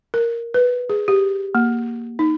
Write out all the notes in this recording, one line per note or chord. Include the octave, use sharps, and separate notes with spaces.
A#4
B4
G#4
G4
A#3
D#4